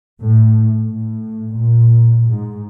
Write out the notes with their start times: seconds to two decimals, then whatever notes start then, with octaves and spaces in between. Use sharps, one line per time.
0.22 A2
0.86 A2
1.54 A#2
2.29 G#2